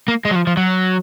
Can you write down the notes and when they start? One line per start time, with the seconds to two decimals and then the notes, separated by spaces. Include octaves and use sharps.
0.08 A#3
0.25 G#3
0.31 F#3
0.35 F3
0.47 F3
0.57 F#3